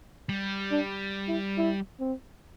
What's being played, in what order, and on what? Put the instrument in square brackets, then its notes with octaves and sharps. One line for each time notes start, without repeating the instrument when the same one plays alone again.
[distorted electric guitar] G3
[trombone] D4
E4
E4
C4